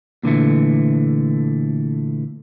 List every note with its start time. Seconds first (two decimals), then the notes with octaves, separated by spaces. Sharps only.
0.23 A#2 D3 E3 A3